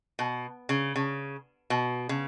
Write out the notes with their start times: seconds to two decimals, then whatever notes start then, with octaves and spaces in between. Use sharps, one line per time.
0.19 B2
0.69 C#3
0.96 C#3
1.70 B2
2.09 C#3